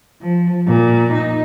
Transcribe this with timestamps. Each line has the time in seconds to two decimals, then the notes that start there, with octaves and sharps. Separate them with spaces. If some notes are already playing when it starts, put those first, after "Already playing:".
0.21 F3
0.66 A#2
1.13 D#4